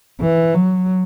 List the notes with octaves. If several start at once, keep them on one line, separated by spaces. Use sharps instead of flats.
E3
F#3